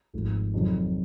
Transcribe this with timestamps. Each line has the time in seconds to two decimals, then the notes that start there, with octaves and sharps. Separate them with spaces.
0.13 G#1 G#2 F3 A3
0.54 F2 C3 D#3 F#3